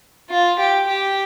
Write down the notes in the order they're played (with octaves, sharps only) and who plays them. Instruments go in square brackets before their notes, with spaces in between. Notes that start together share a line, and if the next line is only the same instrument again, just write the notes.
[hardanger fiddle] F4
G4
G4